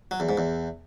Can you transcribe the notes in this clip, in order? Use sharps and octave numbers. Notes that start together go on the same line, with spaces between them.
F#3
E2
G#2
E2